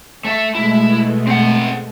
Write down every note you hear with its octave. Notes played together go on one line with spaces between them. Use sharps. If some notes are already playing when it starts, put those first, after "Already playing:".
A3 E5
B2 G#3 A3 E4
C4 F#5